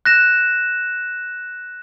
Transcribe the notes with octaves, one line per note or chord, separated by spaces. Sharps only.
F#6 A#6 E7